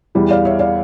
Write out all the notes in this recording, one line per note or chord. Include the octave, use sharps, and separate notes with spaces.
E2 E3 G3
D5 F5
C#5 E5
D5 F5